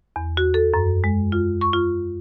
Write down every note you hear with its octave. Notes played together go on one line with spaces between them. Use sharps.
E2
F#4
A4
F#2
G#3
F4
C#6
F4